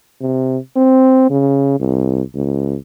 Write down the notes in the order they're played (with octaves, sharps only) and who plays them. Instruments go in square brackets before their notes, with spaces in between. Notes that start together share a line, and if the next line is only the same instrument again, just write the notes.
[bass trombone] C3
C4
C#3
C2
C#2